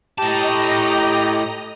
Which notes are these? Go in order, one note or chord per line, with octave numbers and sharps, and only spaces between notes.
A2 G4 D#5 A5 A#5